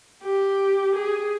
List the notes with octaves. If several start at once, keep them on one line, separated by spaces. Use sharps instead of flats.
G4
G#4